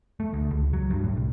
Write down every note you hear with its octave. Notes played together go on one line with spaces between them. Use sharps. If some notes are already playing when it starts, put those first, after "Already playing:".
A3
D2
C#2
F#3
G2
A2
C2